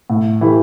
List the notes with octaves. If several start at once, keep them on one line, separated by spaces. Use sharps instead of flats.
A2
E3 A3 E4 G4